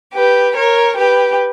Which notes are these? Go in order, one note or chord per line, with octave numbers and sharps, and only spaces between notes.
G4 B4
A#4 C#5
G4 B4